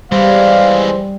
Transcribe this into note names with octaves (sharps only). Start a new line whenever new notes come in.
E3 G3 G#3 C5 F5